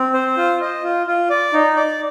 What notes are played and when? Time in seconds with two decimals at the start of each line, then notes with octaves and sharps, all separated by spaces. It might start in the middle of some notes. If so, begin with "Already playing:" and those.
Already playing: C4
0.14 C5
0.37 F4
0.61 D#5
0.83 F4
1.07 F4
1.30 D5
1.53 D#4
1.76 D5